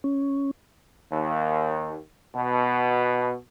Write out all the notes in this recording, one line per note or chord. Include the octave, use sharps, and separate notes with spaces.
C#4
D#2
B2